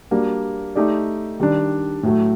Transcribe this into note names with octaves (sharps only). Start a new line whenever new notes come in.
G3 A#3 D4 F#4
A3 D#4 G4 D5
D#3 G3 D4
A2 F#3 A3